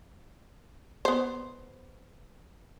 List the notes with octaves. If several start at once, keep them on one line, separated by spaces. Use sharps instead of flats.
B3 C5